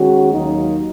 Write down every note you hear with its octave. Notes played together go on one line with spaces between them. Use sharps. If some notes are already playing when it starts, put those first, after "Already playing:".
Already playing: D#3 G#3 C#4 F#4
D#2 D#3 F#3 A#3 D#4